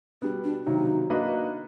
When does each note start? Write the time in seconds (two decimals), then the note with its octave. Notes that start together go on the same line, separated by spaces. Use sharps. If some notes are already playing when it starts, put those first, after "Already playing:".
0.22 B2 G3 B3 D4
0.44 D4
0.66 C3 D#3 F#3 A#3 D#4
1.10 A#3 D4 F#4 B4 D#5